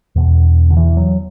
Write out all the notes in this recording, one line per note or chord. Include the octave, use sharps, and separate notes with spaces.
E2 B2
D3
E3
F#3